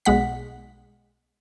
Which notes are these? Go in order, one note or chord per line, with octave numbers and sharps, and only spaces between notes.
B1 G#3 F#5 B6